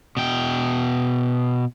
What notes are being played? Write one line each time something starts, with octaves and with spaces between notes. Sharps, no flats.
B2 G5